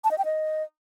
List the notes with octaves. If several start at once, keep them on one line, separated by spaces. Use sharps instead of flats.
A5
D#5
G5
D#5